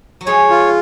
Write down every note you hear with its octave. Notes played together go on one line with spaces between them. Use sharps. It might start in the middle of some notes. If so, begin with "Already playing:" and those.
F#3
F3 G#3 C#5
F4